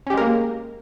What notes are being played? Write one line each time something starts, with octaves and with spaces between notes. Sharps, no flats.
G#3 A#3 C#4 G4 A#4